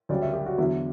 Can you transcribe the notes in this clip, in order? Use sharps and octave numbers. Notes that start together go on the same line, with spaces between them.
D2 C#3 G3 D5
E5
G4
F#4
E2 D3 F#3 E4